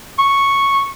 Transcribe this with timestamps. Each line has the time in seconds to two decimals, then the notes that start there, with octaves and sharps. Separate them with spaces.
0.18 C#6